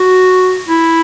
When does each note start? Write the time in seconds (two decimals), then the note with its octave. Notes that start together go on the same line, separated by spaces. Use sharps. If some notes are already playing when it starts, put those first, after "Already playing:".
Already playing: F#4
0.69 E4